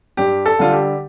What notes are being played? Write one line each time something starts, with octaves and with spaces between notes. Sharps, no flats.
G2 G4
A4
D3 G3 F4
G4